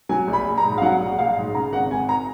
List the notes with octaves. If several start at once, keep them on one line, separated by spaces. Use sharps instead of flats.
F#3 G#5
A#1
B5
A#1
A#5
G#2
F5
F#3 F#5
A#1
A#1 F5
G#2
C#3 A#5
G#1 F#5
G#1 G#5
A#5